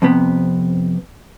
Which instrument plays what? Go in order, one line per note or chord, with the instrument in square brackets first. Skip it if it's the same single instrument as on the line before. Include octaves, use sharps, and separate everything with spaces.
[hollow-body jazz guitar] F2 C3 B3